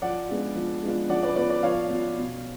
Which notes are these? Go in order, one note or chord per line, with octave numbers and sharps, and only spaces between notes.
F3 D5 F#5
G#3 B3 D4 F4
F3
G#3 B3 D4 F4
F3 D5 F#5
B4 D5
B3 F4 B4 D5
B4 D5
F3 C#5 F5
B3 F4
B2